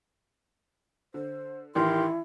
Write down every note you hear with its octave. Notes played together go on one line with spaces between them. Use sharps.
D3 C5
A1 D#3 E3 E4 G4 A#4 C6